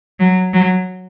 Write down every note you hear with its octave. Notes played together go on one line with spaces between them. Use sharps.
F#3
F#3